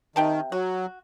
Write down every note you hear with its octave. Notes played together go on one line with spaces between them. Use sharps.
C3 D#3 G5 A5
F#3 F#4